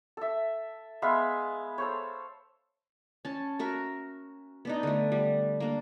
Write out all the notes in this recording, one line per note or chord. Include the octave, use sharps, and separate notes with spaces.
A4 E5
G#3 B3 E5 F5
A4 C5 C#5
C#4 A5
F#4 A#4 E5
B3 D4 D#4
D3 A3
G3
A#3 D4